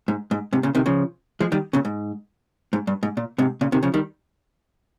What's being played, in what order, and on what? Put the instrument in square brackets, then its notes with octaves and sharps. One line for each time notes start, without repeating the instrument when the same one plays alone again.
[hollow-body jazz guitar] G#2
G#2
G#2 C3
A#2 C#3
C3 D#3
C#3 F3
F3 G#3
D#3 G3
A#2 C#3
G#2
G#2
G2
G#2
A#2
G#2 C3
A#2 C#3
C3 D#3
C#3 F3
D#3 G3